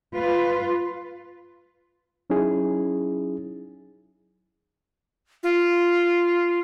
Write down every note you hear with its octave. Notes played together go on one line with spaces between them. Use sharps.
F4 B4
F#3 C#4 D#4 E4 G#4
F4